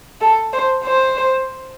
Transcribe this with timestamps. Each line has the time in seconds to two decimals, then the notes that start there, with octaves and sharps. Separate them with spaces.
0.21 A4
0.53 C5
0.85 C5